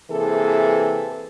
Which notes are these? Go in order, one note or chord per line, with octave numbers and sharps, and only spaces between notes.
C3 E3 A#3 G#4 A4